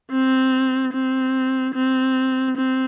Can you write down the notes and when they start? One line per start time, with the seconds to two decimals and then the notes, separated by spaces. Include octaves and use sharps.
0.11 C4
0.93 C4
1.75 C4
2.57 C4